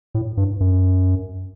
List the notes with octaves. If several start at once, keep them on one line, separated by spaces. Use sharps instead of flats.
A2
G2
F#2